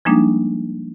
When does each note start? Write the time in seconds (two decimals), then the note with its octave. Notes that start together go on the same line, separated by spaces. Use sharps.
0.05 F3 G3 G#3 A#3 D4 D#4